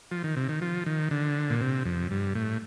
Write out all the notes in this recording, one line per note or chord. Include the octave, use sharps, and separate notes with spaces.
F3
D#3
C3
D#3
F3
D#3
D3
A#2
C3
F2
G2
A2